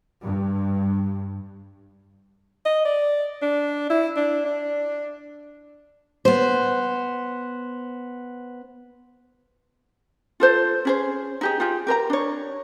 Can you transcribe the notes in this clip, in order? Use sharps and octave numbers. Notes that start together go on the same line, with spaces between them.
G2
D#5
D5
D4
E4
D4
D4
B3 C5
F4 A4 C5
C#4 G#4 C5
D#4 G4 G#4
F4 G4 G#4
G4 A#4 B4 A#5
D4 C#5